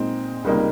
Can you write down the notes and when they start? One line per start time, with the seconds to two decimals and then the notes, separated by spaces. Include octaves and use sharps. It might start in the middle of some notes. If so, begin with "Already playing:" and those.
Already playing: A#2 G#3 C4 D#4
0.44 C#2 C3 G3 A#3 D#4